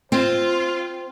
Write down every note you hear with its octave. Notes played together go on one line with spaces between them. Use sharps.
C4 F4 C5